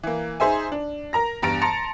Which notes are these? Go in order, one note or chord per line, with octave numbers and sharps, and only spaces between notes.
E3 A#3
D#4 G#4 C5 E5 G#5
D4
A#4 A#5 A#6
E2 G2 A#5 A6 D7
A5 A#5 C6 A6 C#7